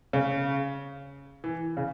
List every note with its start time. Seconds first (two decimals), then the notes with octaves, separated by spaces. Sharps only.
0.13 C#3
1.44 E3
1.77 C#3